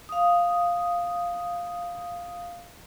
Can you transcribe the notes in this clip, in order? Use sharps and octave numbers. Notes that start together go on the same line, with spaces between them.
F5 D#6